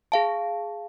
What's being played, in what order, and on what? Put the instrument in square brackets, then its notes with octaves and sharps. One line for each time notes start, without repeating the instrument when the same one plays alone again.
[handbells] G#4 F5 A5